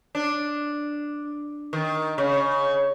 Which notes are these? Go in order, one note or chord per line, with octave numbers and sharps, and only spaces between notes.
D4
D#3
C#3